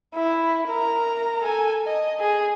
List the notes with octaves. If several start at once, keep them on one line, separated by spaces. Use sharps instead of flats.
E4
A#4 A#5
A4 G#5
D#5
G#4